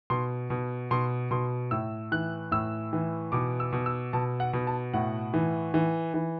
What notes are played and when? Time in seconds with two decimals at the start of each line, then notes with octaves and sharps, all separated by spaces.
0.10 B2 C6
0.50 B2
0.91 B2 C6
1.31 B2 C6
1.71 A2 E6
2.12 E3 F#6
2.51 A2 E6
2.93 E3
3.32 B2 D6
3.60 E6
3.73 B2
3.86 E6
4.13 B2 A5
4.40 F#5
4.53 B2
4.67 A5
4.93 A2 F#5
5.34 E3
5.74 E3
6.14 E3